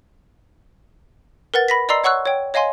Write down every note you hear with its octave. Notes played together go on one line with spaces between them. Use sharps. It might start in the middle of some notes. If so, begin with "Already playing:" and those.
A#4 B4 F#5 A6
B5 A#6 B6
D5 D#5 A#5 C6 E6 C7
C#5 F#5 C#6 E6 F#6
C#5 G5
C#5 D#5 F5 G#5 C6